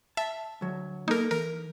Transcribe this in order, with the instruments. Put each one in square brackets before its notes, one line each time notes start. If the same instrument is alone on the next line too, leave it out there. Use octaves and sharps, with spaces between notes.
[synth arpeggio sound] E5 [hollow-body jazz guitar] A5
[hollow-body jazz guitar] D2 F#3
[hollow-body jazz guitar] A#3 A4 [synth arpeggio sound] D#4 A#4
[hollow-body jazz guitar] E3 [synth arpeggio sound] A#4